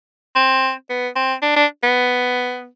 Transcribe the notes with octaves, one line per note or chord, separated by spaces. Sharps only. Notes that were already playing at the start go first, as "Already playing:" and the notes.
C4
B3
C4
D4
D4
B3